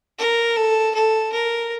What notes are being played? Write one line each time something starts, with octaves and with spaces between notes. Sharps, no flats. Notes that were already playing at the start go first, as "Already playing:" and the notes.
A#4
A4
A4
A#4